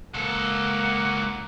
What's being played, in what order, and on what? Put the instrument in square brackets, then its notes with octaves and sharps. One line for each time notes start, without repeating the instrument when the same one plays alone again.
[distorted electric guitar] C#2 A4 [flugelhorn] A#3 [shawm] F#5